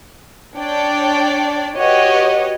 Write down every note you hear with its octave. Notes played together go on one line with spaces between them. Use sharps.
D4 C#5 D5 G5
F#4 G4 B4 C#5 D#5